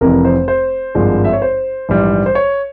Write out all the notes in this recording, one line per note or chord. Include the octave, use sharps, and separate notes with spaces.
F1 F2 C3 E3 A#4
C5
C5
G#1 G2 F3 G#3
E5
C#5
C5
A#1 G#2 E3 G3
C5
C#5